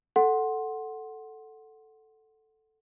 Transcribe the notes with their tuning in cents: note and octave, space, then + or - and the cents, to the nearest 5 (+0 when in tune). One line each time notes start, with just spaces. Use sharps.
A4 +0 F#5 +0 C6 +10